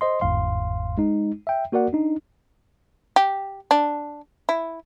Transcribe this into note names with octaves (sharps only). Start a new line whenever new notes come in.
C5 D#5 C6
G1 E2 G#2 F5 C6
G#3 D#4
E5 G5
A#3 F#4 A#4 D5 F#5
D4 D#4
G4
D4
E4